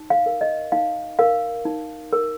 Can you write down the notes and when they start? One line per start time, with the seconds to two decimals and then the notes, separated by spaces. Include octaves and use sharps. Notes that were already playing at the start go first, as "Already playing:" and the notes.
Already playing: D#4
0.10 F5
0.26 A#4
0.41 D#5
0.72 D#4 F5
1.19 A#4 F5
1.65 D#4
2.13 A#4